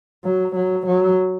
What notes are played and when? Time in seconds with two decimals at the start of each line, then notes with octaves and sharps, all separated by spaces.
0.25 F#3
0.56 F#3
0.86 F#3